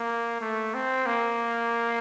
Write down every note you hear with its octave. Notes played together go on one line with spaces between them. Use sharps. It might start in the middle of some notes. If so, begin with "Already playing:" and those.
Already playing: A#3
A3
C4
A#3